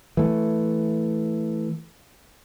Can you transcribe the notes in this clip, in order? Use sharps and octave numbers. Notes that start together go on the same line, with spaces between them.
E3 A3